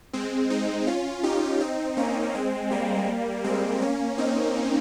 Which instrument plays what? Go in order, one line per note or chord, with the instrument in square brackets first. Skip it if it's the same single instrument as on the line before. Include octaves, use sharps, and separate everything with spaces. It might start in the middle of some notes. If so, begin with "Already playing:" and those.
[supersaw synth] G#3 C4
C4 D#4
C#4 F4
D#4 G4
C4 D#4
A#3 C#4
G#3 C4
G3 A#3
G#3 C4
A#3 C#4
C4 D#4